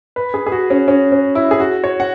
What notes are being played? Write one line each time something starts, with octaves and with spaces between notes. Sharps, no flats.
B4
G#4
G#4
F#4
C#4
C#4
C#4
E4
G#4
F#4
C#5
F#5